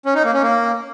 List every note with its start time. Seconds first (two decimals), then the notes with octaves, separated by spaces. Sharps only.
0.06 C#4
0.15 D#4
0.24 A#3
0.34 C#4
0.43 A#3